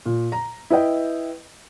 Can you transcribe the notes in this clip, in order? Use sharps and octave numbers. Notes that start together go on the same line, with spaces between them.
A#2
A#5
E4 B4 D#5 G5